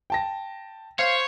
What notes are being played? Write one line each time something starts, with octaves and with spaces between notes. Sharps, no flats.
G5 A5 A#6
C5 C#5 F5